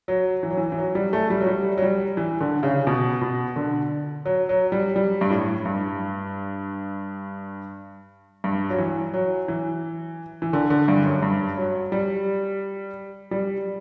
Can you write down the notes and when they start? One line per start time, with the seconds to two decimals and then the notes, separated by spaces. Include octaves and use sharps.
0.08 F#3
0.43 E3
0.50 F#3
0.57 E3
0.72 E3
0.78 F#3
0.95 G3
1.13 A3
1.30 G3
1.41 F#3
1.47 G3
1.78 F#3
1.82 G3
2.17 E3
2.41 D3
2.63 C#3
2.87 B2
3.21 B2
3.56 D3
4.25 F#3
4.49 F#3
4.72 G3
4.96 G3
5.21 G2
5.31 A2
5.66 G2
8.44 G2
8.70 F#3
8.78 E3
9.14 F#3
9.48 E3
10.42 E3
10.53 D3
10.70 D3
10.88 G2
11.05 F#2
11.22 G2
11.57 F#3
11.92 G3
13.31 G3